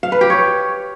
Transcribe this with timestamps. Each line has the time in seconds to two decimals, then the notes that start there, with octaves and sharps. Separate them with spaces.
0.03 F5
0.12 B4
0.21 G4
0.30 C#5